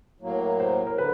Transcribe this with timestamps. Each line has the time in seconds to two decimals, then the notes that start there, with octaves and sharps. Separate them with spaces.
0.20 A2 F#3 A#3
0.60 C5
0.87 A#4
0.98 D3 B4